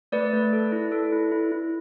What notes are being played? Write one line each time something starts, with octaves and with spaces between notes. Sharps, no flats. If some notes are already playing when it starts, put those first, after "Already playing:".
A3 B4 D5
A3
A4
E4
A4
E4
E4
E4